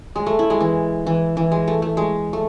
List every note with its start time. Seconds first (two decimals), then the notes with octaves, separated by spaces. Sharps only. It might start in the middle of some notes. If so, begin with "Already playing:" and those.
0.16 G#3
0.26 A3
0.39 E4
0.50 G#3
0.60 E3
1.07 E3
1.37 E3
1.52 G#3
1.68 A3
1.82 A3
1.97 G#3
2.33 A3